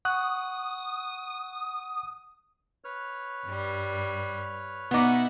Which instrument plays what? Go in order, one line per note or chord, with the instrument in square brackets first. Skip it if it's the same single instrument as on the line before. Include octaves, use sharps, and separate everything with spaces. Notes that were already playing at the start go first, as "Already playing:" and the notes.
[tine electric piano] F#5 C#6 F#6 [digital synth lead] D#6
[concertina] B4 C#5 F6
[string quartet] G2 G3
[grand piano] B2 D6 [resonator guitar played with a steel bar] B3 D#4 [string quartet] E5 F#5